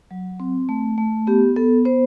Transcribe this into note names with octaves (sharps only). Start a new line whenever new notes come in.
F#3
C4
A3
A3
B3 G4
B3 A4
B3 C5